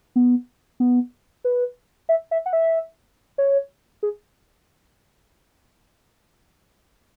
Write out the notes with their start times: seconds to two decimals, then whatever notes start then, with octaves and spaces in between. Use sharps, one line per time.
0.16 B3
0.80 B3
1.44 B4
2.09 E5
2.31 E5
2.46 F#5
2.53 E5
3.38 C#5
4.03 G#4